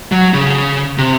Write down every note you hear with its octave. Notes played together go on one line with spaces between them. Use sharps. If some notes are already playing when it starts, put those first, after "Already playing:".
F#3
C#3
C3